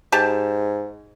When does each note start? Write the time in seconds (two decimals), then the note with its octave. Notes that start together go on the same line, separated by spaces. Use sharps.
0.12 G#2 G4 A5